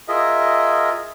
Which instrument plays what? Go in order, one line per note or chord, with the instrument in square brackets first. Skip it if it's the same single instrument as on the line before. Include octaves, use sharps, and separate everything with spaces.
[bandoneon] F4 G#4 A#4 D#5 E5